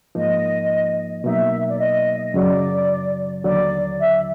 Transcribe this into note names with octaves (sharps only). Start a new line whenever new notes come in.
G#2 F3 A#3 D#4 D#5
B2 F#3 A#3 D#4 E5
D5
D#5
F#2 C#3 F#3 D5
D#2 D3 F#3 D5
E5